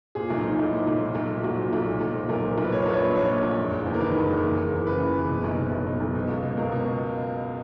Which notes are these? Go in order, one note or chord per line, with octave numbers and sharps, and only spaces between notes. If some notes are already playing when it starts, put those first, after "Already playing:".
A#2 G#4
B1
D#4
A#2
B1 E4
A#2
B1
A#2
B1
A#2
B1 F#4
A#2
B1
A#2
B1
A#2
B1 A#4
A#2
B1
B4
A#2 C#5
A#1 B4
C#5
A#2
A#1 C#5
A#2
A#1
F#1
F#1
E2
A#4
D#3 B4
F#1
F#1
E3
F#1
E2
C#3 B4
E3
F#1
B2
B1
B2
B1
B2
B1
B2
C#2
B2
C#2 A#4
B2